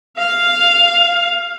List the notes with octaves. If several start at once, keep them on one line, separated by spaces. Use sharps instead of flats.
F5